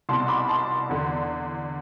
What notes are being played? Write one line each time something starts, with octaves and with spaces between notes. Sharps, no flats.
C2 B2 A5 C6
B5 D6
A5 C6
E2 D3